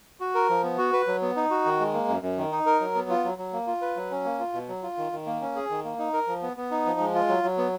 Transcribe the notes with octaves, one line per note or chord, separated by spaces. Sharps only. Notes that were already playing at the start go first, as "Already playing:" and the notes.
F#4
A#4
F3
B3
F#4
B4
F#3
B3
D#4
F#4
D#3
G#3
A#3
F#2
F#2
D#3
D#4
A#4
F#3
B3
F4
F#3
F#3
A#3
F4
B4
F#3
C#4
A#3
F4
B2
F#3
F4
D#3
D#3
A#3
C#4
G#4
D#3
A#3
D#4
A#4
F3
B3
B3
D#4
F3
G#3
F4
F#3
F#3
B3